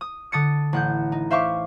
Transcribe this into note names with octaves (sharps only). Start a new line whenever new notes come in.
D#6
D3 D#6 A6 C#7
A1 F#5 G6
D#4
C5 E5 F5 C#6 D6